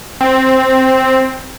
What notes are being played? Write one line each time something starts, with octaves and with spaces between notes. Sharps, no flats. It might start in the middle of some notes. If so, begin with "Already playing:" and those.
C4